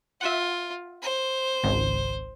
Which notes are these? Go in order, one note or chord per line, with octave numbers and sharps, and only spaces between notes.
F4 E5 F#5
C5
G#1 C#2